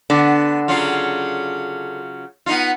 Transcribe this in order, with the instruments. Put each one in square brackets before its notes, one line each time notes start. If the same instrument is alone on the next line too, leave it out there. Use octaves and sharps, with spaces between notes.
[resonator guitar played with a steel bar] D3 D4 [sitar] B3
[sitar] C#3 F#3 F4
B3 D#4 F4